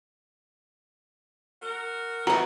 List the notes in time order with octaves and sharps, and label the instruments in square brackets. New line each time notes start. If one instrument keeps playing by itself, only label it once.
[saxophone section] F#4 A#4
[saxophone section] A2 D#3 E3 [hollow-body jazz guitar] B3 F#4 [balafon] A#5